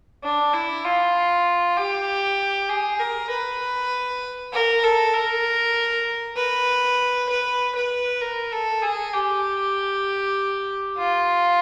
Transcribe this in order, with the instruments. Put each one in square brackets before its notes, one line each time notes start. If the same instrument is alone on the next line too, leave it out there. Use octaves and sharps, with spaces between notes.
[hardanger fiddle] D4
E4
F4
G4
G#4
A#4
B4
A#4
A4
A#4
B4
B4
B4
A#4
A4
G#4
G4
F4